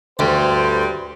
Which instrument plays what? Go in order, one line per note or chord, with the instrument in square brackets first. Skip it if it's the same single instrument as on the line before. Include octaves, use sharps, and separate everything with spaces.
[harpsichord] D2 [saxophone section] G2 G3 [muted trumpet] C5